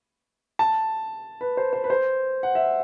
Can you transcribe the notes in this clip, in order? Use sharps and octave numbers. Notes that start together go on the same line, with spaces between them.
A5
B4
C5
C5
B4
C5
F#5
E5